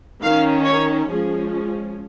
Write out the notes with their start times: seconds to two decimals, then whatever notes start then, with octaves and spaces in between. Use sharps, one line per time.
0.21 D#3 C#4 F5
0.65 C#5
1.09 F3 G#3 C#4 G#4